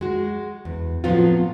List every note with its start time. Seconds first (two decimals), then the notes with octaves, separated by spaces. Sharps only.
0.01 G#3 F#4
0.65 E2
1.04 A2 F3 F#3 B3 C4 F4